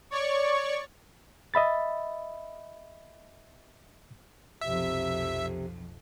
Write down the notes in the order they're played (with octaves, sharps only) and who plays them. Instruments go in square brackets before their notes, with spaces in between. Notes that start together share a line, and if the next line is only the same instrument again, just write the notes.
[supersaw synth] C#5 D5 C#6
[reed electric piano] D#5 E5 B5 A6
[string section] B1 F2 [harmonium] C3 [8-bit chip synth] E5